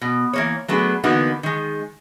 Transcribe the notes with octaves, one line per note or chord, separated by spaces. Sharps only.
B2
E3 A#3 C#5
F#3 A3 B3 D4 G#4
D3 E3 A#3 B3 D#4 F#4
D#3 G#3